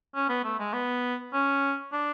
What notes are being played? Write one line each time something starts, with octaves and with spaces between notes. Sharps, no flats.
C#4
B3
A3
G#3
B3
C#4
D4